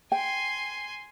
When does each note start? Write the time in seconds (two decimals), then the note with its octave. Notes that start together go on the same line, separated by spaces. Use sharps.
0.12 G5 G#5 C6